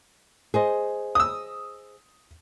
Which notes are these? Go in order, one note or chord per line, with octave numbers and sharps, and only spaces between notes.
G#4 C5 D#5
D#6 E6